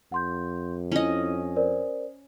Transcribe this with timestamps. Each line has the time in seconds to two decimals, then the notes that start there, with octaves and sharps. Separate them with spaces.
0.12 F2 F#5 C6 G6
0.92 C#4 E4 D#5
1.56 A#4 C5 D5